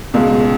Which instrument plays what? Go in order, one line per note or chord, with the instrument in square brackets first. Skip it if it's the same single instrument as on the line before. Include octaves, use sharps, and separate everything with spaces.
[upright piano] C#2 B2 G#3